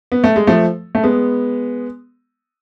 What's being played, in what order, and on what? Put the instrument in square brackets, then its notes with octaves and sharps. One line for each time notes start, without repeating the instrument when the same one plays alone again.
[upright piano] B3
A3
G#3
F3 A3
A3
G#3 B3